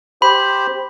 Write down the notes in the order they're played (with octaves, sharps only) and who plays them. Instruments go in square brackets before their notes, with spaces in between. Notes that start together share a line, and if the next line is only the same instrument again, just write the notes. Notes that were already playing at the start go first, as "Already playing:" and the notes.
[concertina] G4 C5 [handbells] B5